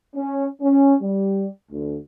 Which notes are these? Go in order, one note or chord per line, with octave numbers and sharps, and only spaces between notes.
C#4
C#4
G3
D2